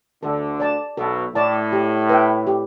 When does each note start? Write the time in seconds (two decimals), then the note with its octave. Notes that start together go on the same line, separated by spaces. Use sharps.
0.23 D2 D3 A4
0.60 D5 A5
0.97 B1 B2 A4
1.35 A2 D5 A5
1.72 G4
2.09 B4 E5 G5
2.47 G4